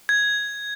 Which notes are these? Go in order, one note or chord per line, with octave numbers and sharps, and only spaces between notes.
G#6